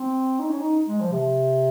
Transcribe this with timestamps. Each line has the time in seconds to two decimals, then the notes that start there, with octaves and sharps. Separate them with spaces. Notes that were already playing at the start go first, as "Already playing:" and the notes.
Already playing: C4
0.39 D#4
0.49 C#4
0.60 D#4
0.87 G#3
1.00 F3
1.12 C3